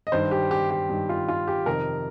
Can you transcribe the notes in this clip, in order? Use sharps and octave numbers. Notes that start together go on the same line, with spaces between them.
D#5
G2 D#3 C5
G4
G4
G4
G2 D#3
F4
F4
G4
F2 C3 D#3 A#4